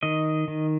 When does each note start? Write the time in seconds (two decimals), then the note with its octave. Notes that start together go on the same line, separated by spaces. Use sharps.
0.03 D#3 D#5
0.48 D#3